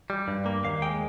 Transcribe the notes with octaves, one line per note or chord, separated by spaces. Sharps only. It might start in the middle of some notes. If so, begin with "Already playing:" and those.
G3
G2
A#3
D#2 F5
G#3 G5